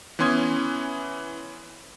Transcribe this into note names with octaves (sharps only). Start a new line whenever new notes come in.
E3 B3 C#4 C6 D#6 G#6